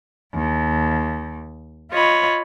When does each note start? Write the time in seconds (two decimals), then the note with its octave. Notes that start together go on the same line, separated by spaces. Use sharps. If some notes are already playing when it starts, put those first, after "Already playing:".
0.33 D#2
1.91 F4 C#5 D#5 B5